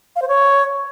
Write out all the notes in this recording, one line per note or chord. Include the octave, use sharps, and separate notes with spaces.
F5
C5
C#5